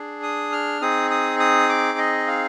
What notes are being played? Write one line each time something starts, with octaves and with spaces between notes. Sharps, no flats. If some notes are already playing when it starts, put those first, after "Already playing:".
Already playing: D4 G#4
D#6
F6
C4 D#4 G#4 D#6
D#6
D#6
D6
D#5
F5